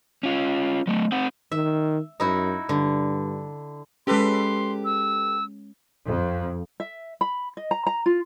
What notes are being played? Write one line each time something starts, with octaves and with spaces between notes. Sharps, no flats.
C#4 F4
F#3 A3
C4 F#5
D#3 E5
F#2 D#4 E4 F#4
G2 D3
G#3 C#4 G4 A4 B4 C6
E6
F2
E5
B5
D#5
A#5
A#5
F4